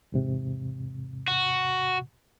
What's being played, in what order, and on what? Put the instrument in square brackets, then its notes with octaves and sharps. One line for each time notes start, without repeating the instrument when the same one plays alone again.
[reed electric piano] E2 G#2 C3
[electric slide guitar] F#4